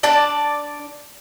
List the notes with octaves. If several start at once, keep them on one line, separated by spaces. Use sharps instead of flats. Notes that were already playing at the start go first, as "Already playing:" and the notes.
D4 D5 A5